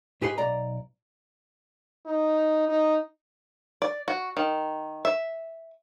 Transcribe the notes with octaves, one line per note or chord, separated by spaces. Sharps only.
G#2 G4 G#4 B4 F#5 C6
B1 D5 A#5
D#4
D#4
D5
F#4
D#3
E5